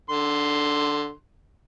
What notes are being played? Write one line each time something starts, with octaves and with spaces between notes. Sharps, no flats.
D3 C6